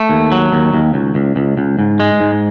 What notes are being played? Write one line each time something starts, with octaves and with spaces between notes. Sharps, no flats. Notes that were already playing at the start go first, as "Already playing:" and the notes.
Already playing: A3
D#2
F#3
D#2
D#2
C#2
C#2
C#2
C#2
G#2
G#3
G#2